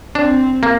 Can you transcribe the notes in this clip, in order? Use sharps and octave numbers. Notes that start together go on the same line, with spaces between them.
C4 D4
A#3